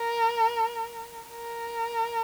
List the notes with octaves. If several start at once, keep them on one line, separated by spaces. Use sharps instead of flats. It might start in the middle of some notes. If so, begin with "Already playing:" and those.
Already playing: A#4
A#4